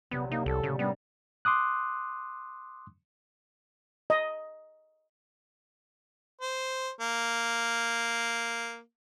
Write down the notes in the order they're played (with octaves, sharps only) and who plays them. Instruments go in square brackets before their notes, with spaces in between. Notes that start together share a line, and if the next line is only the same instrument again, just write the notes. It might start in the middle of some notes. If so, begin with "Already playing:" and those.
[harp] A#1 C3 F#3 [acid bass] B3
[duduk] A#3 [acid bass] D#4
[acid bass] C2 [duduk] A4
[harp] A2 G3 A3 [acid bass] C#3
[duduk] G3 [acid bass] B3 [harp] C#4 D4 A#4
[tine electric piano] C6 D6 D#6 F#6
[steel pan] D#5
[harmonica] C5
A#3